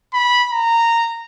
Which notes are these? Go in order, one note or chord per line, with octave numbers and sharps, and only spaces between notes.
B5
A#5